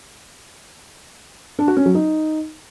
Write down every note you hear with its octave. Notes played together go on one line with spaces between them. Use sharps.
D4
F#4
C#4
F#3
D#4